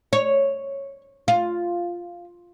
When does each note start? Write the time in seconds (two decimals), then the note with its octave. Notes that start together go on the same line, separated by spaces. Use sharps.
0.13 C#5
1.28 F4